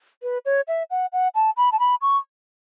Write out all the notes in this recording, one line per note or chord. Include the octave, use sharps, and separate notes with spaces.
B4
C#5
E5
F#5
F#5
A5
B5
A5
B5
C#6